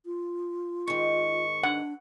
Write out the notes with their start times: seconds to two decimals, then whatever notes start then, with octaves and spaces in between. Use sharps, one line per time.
0.06 F4
0.88 G#2 D#3 C#6
1.63 D4 F#5